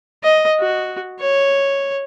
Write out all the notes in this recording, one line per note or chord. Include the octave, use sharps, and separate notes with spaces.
D#5
F#4
C#5